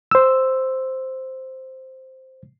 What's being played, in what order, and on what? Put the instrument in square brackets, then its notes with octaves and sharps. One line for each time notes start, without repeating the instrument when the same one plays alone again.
[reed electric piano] C5 E6